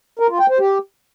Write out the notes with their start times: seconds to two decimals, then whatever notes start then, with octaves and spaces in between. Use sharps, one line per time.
0.19 A#4
0.29 F4
0.39 G5
0.49 C5
0.59 G4